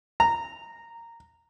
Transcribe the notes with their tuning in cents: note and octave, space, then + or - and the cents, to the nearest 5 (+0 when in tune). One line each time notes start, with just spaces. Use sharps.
A#5 -10